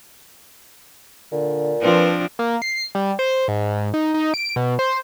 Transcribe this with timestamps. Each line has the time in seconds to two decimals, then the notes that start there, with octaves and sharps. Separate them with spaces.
1.32 A#2 D3
1.82 F3 C4 D4 B4
2.39 A#3
2.62 C7
2.95 G3
3.19 C5
3.48 G#2
3.94 D#4
4.14 D#4
4.34 D7
4.56 B2
4.79 C5